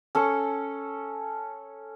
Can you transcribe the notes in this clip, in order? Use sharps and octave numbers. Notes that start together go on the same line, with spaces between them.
C#4 A4 A5 C#6